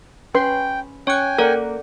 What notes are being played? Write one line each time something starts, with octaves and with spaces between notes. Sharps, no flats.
C#4 B4 G5 C6
C#4 C#5 G5 G#5 C#6 F#6
A#3 A4 A#4 D5 F#5